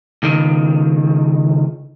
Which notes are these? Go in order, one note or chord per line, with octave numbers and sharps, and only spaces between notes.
C#2 D#3